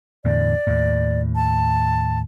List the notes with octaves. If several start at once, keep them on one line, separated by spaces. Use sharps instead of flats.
E2 A2 D3 D5
D#2 A2
A5